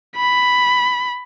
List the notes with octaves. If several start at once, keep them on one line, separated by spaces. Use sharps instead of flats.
B5